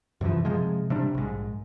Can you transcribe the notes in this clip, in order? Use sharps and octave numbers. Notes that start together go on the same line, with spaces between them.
F#2 C3 E3 F3
C3 F3 G#3
C3 G3 D4
A#1 G#2